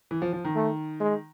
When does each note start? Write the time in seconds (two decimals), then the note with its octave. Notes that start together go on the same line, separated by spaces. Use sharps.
0.11 E3
0.22 F3
0.33 F3
0.45 D#3
0.55 A3
1.00 G#3